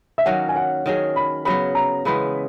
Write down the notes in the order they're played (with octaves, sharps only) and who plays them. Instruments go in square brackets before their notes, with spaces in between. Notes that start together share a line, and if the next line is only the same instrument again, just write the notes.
[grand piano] E5
[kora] D#3 F#3 A#3 C#4 [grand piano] F#5
[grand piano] G#5
F#5
[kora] D#3 F#3 C#4 G#4
[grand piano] B5
[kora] C#3 F#3 B3 [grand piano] B5
[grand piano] A#5
[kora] C#3 E3 G#3 B3 [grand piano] B5